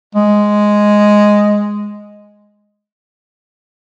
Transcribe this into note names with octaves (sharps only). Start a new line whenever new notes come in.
G#3